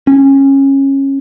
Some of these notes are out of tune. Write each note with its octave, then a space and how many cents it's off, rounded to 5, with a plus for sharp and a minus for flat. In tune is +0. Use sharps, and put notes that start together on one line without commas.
C#4 -20